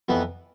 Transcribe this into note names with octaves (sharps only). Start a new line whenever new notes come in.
F2 E3 B3